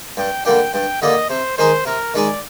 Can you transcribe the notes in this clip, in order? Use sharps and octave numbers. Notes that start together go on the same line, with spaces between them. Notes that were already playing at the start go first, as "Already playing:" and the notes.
G2 G5
D3 G3 A#3 D4 G5
G2 G5
D3 G3 A#3 D4 D#5
C3 C5
D#3 G#3 D#4 G#4 C5
C3 A#4
D#3 G#3 D#4 G#4 D5